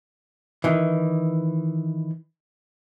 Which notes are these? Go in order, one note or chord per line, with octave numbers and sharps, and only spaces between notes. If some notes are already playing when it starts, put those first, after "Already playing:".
D#3 E3